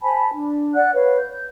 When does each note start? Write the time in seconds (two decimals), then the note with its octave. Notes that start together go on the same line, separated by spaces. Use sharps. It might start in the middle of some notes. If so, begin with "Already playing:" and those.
0.02 C5 G#5 A5 B5
0.33 D4
0.74 D5 F#5 F#6
0.94 B4 C#5 F5
1.19 G6